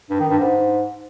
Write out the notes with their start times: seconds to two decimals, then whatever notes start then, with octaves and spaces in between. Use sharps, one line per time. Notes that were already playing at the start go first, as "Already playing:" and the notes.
0.10 G2
0.20 D#3
0.30 G2
0.39 G#2